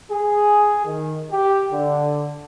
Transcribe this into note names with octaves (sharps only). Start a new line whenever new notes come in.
G#4
D#3
G4
D3